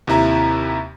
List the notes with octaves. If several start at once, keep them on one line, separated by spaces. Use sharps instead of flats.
D#2 C3 E4 A#5